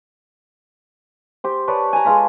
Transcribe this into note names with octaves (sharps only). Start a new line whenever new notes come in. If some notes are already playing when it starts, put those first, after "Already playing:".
G4 C5
B4 C#5 D5 A5
G#5 A#5
G#3 F4 A4 B4